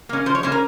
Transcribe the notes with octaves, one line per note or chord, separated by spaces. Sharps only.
A#3 C#4
F3 C5
C#5
A#3 C#4 C5
A#4